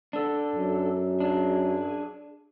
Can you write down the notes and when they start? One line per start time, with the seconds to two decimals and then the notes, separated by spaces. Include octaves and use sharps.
0.13 D4 A4
0.55 F#2
1.20 D4 G#4